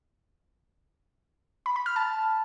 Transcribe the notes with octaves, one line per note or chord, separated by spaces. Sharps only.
B5
B5
F6
A5